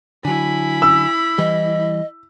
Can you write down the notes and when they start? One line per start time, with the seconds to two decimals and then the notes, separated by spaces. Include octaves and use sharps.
0.25 D3 F#3 E4 G#5 B5
0.82 E6
1.38 E3 G3 D#5